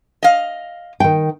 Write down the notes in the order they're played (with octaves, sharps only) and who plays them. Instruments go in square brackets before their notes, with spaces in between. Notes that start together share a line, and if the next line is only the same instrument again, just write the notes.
[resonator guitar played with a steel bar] D#5 F5
[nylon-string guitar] D#3 G5